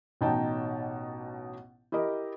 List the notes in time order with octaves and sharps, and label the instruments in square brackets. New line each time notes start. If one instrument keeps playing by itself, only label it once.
[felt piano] A1 B2 D#4 G5 A5
E4 G4 A#4 D#5